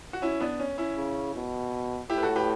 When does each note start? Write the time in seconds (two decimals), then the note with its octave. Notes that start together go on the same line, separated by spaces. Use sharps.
0.13 F#4
0.22 C#4 E4
0.40 B3 D4
0.60 C#4
0.78 C#4 E4
0.97 C#3
1.35 B2
2.10 A2 E4 G4
2.18 B4
2.23 F#4 A4
2.36 G4 B4